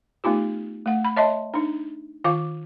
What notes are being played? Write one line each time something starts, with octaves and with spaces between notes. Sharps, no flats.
A3 B3 D#4 F4 G4
A3 F#5
B5
C#5 D#5 E5 A5 C6
D4 D#4
D#3 F4 F5 D6